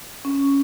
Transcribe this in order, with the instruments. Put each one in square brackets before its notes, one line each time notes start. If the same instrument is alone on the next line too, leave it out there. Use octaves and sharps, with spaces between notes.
[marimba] C#4